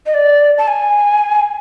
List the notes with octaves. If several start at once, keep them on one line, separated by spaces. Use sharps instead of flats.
D#5
D5
A5
G#5